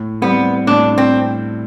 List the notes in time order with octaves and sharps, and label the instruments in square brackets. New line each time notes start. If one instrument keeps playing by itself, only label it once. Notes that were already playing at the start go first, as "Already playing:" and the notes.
Already playing: [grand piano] A2
[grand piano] G3 C4 [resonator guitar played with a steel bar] B3
[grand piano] A2 [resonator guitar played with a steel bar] D4
[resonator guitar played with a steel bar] C4